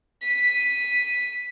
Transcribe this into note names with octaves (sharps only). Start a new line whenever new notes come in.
B6 D#7